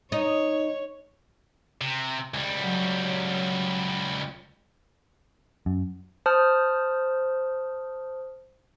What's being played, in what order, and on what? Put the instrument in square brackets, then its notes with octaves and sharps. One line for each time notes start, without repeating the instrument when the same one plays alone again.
[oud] D#4 [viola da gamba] C#5
[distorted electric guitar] C3
C#2 G3
[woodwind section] F#3
[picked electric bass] F#2
[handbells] C5 A5 D#6 F6